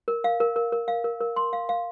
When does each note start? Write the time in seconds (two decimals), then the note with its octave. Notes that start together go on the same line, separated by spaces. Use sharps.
0.08 A#4
0.24 F5
0.40 A#4
0.56 A#4
0.72 A#4
0.88 F5
1.04 A#4
1.21 A#4
1.36 C6
1.53 F5
1.69 F5